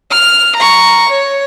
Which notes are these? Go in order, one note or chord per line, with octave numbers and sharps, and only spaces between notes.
F6
A#5 C#6
C#5